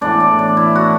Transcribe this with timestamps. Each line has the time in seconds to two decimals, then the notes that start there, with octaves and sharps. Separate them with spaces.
0.01 A2 E3 B3 D4 D5
0.20 D5
0.39 D5
0.57 E4
0.75 F#4